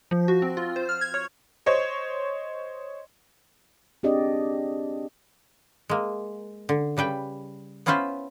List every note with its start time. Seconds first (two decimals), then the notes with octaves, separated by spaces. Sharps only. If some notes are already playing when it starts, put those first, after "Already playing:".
0.11 F3
0.28 F#4
0.42 C4
0.57 F4
0.76 C5
0.89 F6
1.01 G#6
1.14 C#5
1.66 C5 C#5 D#5
4.03 C4 D4 G4 G#4 D5 D#5
5.89 G#3 A#3
6.69 D3
6.97 C#3 G3 B4 G5
7.86 B3 C#4 E4 F4 B4 C5